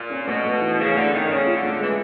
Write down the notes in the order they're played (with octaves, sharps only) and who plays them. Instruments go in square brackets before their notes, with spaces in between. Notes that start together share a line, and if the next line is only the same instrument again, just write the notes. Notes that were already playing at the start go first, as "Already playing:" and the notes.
Already playing: [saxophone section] A#2
[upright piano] C#4
[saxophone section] B2 [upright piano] A3
[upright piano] A3
E3
[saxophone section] C#3 [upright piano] E3
[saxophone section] D3 [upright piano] A3
[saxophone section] D#3 [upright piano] C#4
[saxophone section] C#3 [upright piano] C#4
[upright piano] F4
[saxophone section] D3
[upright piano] A3
[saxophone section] E3 [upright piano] G#3